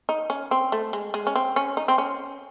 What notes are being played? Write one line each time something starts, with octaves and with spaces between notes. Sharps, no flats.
D#4
C#4
C4
A3
G#3
G#3
C#4
C4
C#4
D#4
C4
C#4